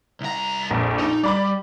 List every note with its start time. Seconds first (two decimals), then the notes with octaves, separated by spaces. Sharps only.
0.21 C2 A#5
0.71 A#1 F2
0.99 D#4
1.24 G3 D5 B5 D6